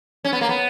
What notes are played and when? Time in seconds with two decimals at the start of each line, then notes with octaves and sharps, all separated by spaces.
0.25 C#4
0.33 B3
0.41 A#3
0.49 B3